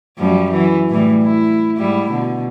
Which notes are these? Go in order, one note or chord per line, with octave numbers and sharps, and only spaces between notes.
F#2 F3 G3
E3 F#3
A2 E3 G3
E4
G#2 G3 E4
B2 D3